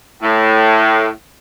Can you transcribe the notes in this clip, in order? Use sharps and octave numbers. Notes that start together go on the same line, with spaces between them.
A2